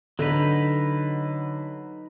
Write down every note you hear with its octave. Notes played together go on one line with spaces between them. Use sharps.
D3 F#3 D#4 B4